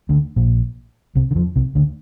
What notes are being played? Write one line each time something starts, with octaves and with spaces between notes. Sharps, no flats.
D2 D3
A#1 A#2
C2 C3
D3
F2 F3
C2 C3
D2 D3